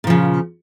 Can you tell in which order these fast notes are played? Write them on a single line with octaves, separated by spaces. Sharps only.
A#2 F3 C#3